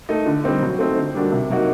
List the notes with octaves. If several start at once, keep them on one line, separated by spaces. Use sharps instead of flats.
A3 D#4
D3
G3 C4 D#4
F#3
A3 C4 D#4
D3
G3 A#3 D4 F#4
C3
F#3 A#3 D#4 F#4